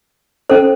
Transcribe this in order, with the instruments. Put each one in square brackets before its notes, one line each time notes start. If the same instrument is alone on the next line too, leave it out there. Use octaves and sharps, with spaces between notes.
[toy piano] C#4 A4 C5